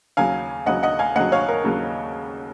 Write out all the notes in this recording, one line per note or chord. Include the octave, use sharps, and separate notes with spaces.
D#2 C#3 F#3 F5 G#5
D#2 C#3 F#3 D#5 F#5
D#5 F#5
F5 G#5
D#2 C#3 F#3 D#5 F#5
C#5 F5
A#4
D#2 C#3 F#3